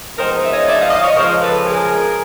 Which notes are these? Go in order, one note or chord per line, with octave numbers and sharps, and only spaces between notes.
F3 G#3 B3 D#4 A#4 C5
E5
C#5 D#5
D5 E5
D#5 F5
D#5 F5
C#5 D#5
C#3 F3 G#3 A#4 C5
A4 B4
G#4 A#4